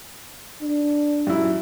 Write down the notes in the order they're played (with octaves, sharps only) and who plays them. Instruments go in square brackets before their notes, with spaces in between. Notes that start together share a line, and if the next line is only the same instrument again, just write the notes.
[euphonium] D4
[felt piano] F#2 E4